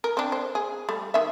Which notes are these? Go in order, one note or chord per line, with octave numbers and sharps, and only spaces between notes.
A#4
C4 D4
C5
G#4
G3 A3
D#3 E5